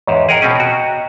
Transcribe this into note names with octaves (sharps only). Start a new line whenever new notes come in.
E2 G#2 C#5 D#5
G#4 A#4 D#5 F#5 G5 A#5
B2 C4 C#4
F#4